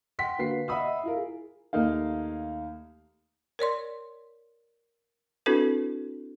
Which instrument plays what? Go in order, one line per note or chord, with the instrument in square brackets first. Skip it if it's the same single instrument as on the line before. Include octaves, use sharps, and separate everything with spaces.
[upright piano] F#5 G5 C6 B6
D3 A#3 F#4 B4 C7
D#5 E5 F#5 B5 D#6 E6
E4 F4 A#4
G#4
[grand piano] D#2 A3 A#3 D#4 F5
[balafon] A#4 C#5 D5 C6
C4 D4 E4 F#4 A4 B4